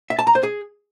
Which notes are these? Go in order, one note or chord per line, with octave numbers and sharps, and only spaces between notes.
E5
A5
A#5
C5
G#4